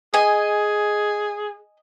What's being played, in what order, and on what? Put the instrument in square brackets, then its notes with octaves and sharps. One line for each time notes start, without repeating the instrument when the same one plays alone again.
[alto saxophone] G#4 [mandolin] D#5 G#5